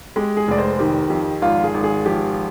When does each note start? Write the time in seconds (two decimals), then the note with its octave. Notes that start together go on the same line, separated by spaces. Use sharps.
0.16 G#3 G4
0.37 G#4
0.48 F1 D5
0.58 C5
0.79 D#3 G4
1.10 F2 G4
1.42 G#1 F4
1.64 G#4
1.74 G#1
1.84 G#4
2.05 F3 G4